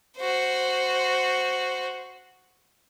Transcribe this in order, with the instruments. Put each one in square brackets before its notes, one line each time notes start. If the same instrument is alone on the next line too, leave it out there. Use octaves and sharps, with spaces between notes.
[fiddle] F#4 C5